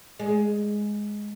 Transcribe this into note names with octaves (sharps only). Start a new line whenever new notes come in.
G#3